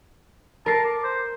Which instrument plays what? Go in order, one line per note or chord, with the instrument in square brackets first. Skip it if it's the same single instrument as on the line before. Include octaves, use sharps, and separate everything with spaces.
[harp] A#4 C7 [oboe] A5
[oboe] D6
C5